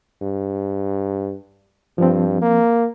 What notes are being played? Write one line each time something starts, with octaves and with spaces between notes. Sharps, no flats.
G2
G2 F3 C4
A#3